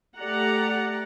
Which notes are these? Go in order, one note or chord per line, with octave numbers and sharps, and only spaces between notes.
A3 G4 D5 F#5 A#5